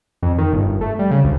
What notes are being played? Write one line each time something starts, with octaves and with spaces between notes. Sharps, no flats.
F2
D#3
G1
G1
A3
G3
C#3
D2